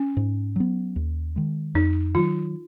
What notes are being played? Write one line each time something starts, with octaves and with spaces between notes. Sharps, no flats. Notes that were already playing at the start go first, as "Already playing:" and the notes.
Already playing: C#4
G#2
F#3 B3
D#2
D#3 G#3
F2 D#4
D#3 F#3 F4